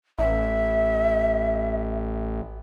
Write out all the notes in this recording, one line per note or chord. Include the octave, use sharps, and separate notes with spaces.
A1 E5